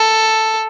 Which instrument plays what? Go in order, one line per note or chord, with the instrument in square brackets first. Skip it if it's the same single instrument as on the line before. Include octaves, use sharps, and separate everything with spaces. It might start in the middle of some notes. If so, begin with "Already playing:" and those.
Already playing: [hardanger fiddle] A4